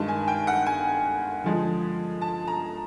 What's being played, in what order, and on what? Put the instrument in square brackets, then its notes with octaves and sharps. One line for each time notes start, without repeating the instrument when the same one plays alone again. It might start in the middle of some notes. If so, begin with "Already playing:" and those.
Already playing: [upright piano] G2 D#3 G#3 A5
G#5
G5
F#5
G#5
D3 F3 G#3
A5
A#5